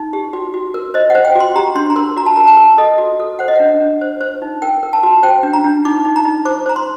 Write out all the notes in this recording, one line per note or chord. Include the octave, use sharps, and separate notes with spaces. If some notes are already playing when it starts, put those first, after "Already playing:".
Already playing: D#4
G4
F#4
F#4
A#4
C5 D#5
F#5
C5
G5
F#4
C6
G4 A#5
D4 C6
A#5
A#4 C6
F#4 A#5
A5
A#4 A#5
A5
A#4
A4 D#5
F#4
A4
C5 F#5
D#5
D4 F#5
D4
C5
C5
D#4
A#4 G5
A#4
A5
F#4
C5 G5
D4
A#5
D4
D#4 D6
D#4
A#5
D#4
C5 D6
C5 A#5
C6